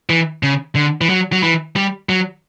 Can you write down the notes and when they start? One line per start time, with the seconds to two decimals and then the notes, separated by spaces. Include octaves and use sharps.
0.10 E3
0.43 C#3
0.75 D3
1.01 E3
1.09 F#3
1.32 F#3
1.43 E3
1.76 G3
2.09 F#3